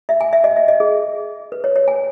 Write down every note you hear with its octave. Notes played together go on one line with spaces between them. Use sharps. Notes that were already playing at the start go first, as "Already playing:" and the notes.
E5
G#5
E5
D#5
E5
D#5
G#4
B4
C#5
C#5
G#5